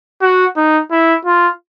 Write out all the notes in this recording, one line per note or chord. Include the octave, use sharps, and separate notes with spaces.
F#4
D#4
E4
F4